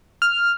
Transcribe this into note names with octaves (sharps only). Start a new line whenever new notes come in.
F6